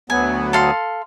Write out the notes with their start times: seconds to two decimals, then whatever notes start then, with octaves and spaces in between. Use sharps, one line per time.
0.10 D2 F#3 B3 G#5
0.53 A4 F5 C6